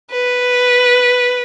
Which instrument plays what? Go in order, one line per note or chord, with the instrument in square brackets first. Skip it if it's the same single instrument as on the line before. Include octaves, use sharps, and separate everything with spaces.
[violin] B4